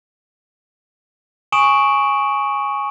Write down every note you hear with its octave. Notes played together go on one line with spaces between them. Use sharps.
G#5 C#6 D#6 D7 E7 F#7